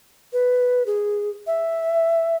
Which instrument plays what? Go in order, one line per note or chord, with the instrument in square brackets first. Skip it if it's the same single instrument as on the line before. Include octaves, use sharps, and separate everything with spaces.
[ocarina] B4
G#4
E5